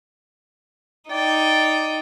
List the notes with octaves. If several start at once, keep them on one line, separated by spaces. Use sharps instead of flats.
D#4 D5 G5